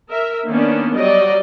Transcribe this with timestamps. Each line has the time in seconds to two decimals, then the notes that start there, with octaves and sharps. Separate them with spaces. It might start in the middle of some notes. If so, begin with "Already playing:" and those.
0.10 A#4 E5
0.47 D#3 A#3 B3 C#4 D4
0.96 F#3 G3 D5 D#5